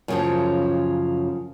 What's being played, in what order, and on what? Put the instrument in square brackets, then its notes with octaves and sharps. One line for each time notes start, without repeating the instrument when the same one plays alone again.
[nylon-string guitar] F#2 C#3 F3